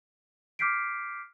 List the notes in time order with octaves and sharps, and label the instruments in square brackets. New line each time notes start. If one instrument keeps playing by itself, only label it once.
[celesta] D6 F6 G6 B6 C7 D7